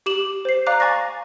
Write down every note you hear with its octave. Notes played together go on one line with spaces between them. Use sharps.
G4 D6 E7 F#7
C5 C7
D5 F5 A#5 D6 F#6
G#5 C#6 A6 A#6